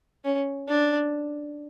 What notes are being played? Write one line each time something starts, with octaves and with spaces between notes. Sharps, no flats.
C#4
D4